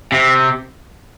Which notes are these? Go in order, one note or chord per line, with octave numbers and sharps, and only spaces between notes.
C3